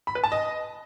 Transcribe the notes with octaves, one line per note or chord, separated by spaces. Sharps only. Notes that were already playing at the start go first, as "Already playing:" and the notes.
B5
B4
A5
D#5